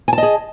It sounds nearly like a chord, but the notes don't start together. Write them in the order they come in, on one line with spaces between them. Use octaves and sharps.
G#5 A5 D#5 G#4